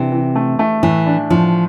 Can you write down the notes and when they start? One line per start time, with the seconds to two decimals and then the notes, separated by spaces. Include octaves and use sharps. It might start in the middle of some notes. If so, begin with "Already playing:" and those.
Already playing: C3 E3 D4
0.12 E3
0.36 A3
0.59 A3
0.83 A2 E3
1.06 D4
1.30 A2 F3